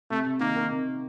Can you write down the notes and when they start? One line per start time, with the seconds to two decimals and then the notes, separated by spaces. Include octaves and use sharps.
0.10 C3 A3
0.26 C3
0.40 D#3 A#3
0.56 D#3
0.72 C3